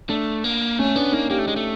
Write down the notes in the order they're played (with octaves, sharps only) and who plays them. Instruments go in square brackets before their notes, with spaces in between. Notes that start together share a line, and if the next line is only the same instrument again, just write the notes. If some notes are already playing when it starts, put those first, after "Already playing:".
[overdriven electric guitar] A3 [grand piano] D4
[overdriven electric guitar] A#3
[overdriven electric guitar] A3 [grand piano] C#4
[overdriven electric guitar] B3 [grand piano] D4
[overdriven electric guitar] A#3 [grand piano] D#4
[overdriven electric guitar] A#3 [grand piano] G4
[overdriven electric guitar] A3
G#3
A3